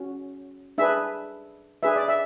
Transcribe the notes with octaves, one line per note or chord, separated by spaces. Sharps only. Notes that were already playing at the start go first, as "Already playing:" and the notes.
Already playing: C#4 F#4
D4 G#4 B4 E5
D4 G#4 B4 E5
D5
E5